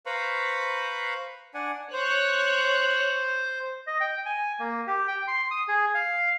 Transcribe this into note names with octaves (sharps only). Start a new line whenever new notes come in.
B4 C5 F5 A#5 B5 C#6
D4 D5 F#5 G#5
C5 C#5 F#6
D#5
G5
G#5
A#3
G4
G5
C6
D#6
G#4
F5